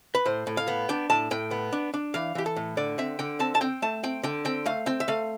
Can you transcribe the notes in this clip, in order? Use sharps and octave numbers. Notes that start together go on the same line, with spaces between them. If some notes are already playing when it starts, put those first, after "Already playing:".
B4
A2 C5
A2
F5
B3
D4 G5
A2 A5
A2 G5
B3
D4
D4
E3 F5
E3 G4
A4
A2
D3 D5
C4 E5
D3 G5
C4 A5
A5
C4 G5
A3 A5
C4 G5
D3 G5
C4 G5
A3 F5
C4 G5
E5
A3 F5